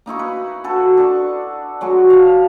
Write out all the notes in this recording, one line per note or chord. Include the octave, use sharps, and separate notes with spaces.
A#3 D#4 E4 C#6
B4
F#4 A4 B4
D4 C#6
F#3 G#3 F#4
F5 A5